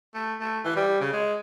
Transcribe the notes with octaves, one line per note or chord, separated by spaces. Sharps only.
A3
A3
E3
G3
C#3
G#3